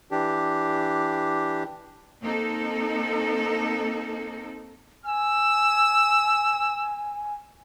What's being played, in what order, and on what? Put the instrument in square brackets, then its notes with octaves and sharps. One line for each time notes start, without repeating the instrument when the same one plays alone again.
[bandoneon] E3 D4 G4
[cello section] A#3 C4 D#4 A4
[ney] G#5 [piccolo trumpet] E6